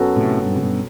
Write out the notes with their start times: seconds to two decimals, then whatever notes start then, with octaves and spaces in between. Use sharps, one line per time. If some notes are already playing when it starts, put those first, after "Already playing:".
Already playing: F#2 F#3 B3 F#4 A4
0.16 A2 C3
0.44 G2 B2
0.56 C3
0.62 G2 B2